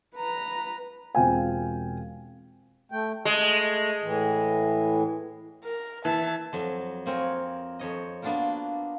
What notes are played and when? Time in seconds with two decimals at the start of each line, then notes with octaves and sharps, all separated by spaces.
0.15 B4 A#5
1.15 E1 C4 F4 F5 G5 G#5
2.92 A3 G5
3.25 G#3 A3
4.03 A2 E3
5.64 A#4
6.05 E3 E5 A5
6.53 F2 F#3
7.06 A#3 C4 A#4 C#5 G#5
7.79 F2 C#5 D#5
8.22 A#3 B3 D4 F4 F#4 A#4